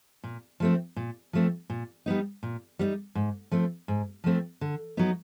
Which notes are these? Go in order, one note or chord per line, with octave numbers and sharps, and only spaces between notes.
A#2
F3 A3 C4
A#2
F3 A3 C4
A#2
G3 B3 D#4
A#2
G3 B3 D#4
G#2
F3 A3 C4
G#2
F3 A3 C4
D3
F#3 B3 D#4